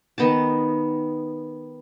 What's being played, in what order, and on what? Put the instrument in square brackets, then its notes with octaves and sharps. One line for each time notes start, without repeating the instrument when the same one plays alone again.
[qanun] D#3 B3 D#4 A5